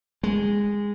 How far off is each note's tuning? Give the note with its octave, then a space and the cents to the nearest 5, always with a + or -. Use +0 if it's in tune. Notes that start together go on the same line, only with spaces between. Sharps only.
G#3 -15